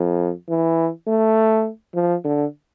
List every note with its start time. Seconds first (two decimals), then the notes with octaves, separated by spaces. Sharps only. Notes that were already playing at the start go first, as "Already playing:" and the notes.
Already playing: F2
0.48 E3
1.07 A3
1.95 F3
2.24 D3